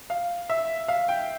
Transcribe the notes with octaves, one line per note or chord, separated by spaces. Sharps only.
F5
E5
F5
G5